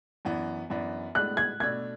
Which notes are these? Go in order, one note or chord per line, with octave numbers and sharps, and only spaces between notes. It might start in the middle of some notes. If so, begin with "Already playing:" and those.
F#2 E3 B3 D4
F#2 E3 B3 D4
A2 G#3 B3 D4 F#6
G#6
B2 A3 D4 G#6